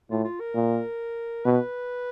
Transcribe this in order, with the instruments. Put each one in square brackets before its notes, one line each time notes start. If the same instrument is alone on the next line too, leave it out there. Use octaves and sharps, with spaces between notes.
[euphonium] A2 [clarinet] F4
[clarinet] F4
A#4
[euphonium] A#2
[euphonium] B2 [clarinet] B4